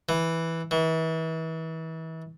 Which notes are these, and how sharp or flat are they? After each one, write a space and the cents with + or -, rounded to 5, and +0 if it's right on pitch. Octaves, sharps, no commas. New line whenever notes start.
E3 -5
E3 -35